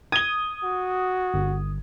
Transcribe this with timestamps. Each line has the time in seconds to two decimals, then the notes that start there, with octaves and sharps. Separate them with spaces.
0.12 D#6 G#6 G7
0.64 F#4
1.34 G1